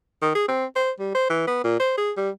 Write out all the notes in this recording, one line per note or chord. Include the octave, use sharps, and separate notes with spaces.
D#3
G#4
C4
C5
G3
C5
E3
B3
A#2
C5
G#4
G3